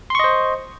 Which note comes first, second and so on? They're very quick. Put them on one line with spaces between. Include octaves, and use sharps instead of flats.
C6 C#6 D#5 C5